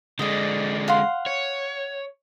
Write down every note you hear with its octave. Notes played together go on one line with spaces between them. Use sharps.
D3 G#3 D5 D#5
F5 F#5 C6
C#5